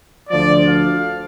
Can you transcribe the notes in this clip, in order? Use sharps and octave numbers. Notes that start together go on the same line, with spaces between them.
D2 D3 F3 D5
F5